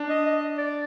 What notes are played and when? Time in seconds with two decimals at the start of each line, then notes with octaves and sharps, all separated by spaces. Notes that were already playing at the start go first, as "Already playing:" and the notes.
Already playing: D4
0.09 D#5
0.26 D#5
0.58 D5